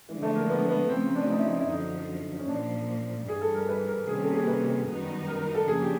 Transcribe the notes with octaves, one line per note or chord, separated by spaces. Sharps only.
D3 E3 F3 G#3
A3
A#3
B3
B3
C#3 F3 A3 C4 C#4
D4
D#4
E4
D#4
E4
F#2 D3 F3 D#4
C#4
A#2 F3 A#3 D4
G2 E3 G3 G#4
A4
A#4
B4
A#4
C3 D#3 G3 A#3 C#4 G#4
A4
G#4
B4
F#2 D#3 G3 B3 D#4
A#4
A#4
A4
C#3 F3 A#3 D4 G#4
G4